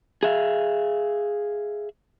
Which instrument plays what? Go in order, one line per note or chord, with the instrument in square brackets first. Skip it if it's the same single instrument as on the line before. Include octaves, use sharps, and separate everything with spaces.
[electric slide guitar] G#4 E5 F5